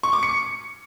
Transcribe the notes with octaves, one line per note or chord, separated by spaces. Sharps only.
C#6
D6
C#7